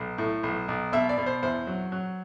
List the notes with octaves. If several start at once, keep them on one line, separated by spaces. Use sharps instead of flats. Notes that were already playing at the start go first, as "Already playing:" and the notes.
Already playing: B1
A2
B1
B1
B2 E5
D5
B2
C5
E2 C5
F#3
F#3